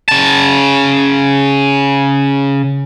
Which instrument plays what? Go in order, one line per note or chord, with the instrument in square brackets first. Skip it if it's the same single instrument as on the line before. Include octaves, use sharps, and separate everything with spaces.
[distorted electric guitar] C#3 A5